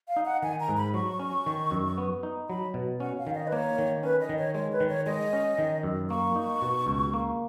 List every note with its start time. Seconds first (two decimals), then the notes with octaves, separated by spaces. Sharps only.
0.08 F5
0.16 D#4
0.25 F#5
0.42 D#3 G#5
0.60 A#5
0.69 G#2
0.77 B5
0.94 F#3 C#6
1.19 C#4
1.46 D#3
1.71 F#2
1.98 B3
2.23 D#4
2.49 F#3 B5
2.74 B2
3.00 C#4 F#5
3.18 F5
3.27 D#3
3.34 D#5
3.47 B4
3.52 A#3 C#5
3.78 D#3
4.03 C#4 B4
4.21 D#5
4.29 D#3
4.39 C#5
4.55 G#3 C#5
4.72 B4
4.80 D#3
4.89 C#5
5.06 G#3 D#5
5.33 C#4
5.58 D#3
5.83 F#2
6.10 A#3 C#6
6.36 D#4
6.62 B2
6.87 C#2
7.14 A#3